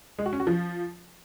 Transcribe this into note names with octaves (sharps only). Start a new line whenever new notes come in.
G#3
F#4
C#4
F#4
F3